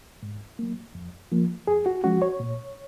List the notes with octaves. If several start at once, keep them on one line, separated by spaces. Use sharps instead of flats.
G#2
F#3 A#3
F2
F3 A#3
F2 G#4
F#4
F3 G#3 C#4 F#4
C#5
A#2